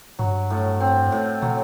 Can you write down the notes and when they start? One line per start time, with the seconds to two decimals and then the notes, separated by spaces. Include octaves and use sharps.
0.19 G2 F#3
0.50 A2
0.80 C4
1.12 A2
1.42 B2 F#3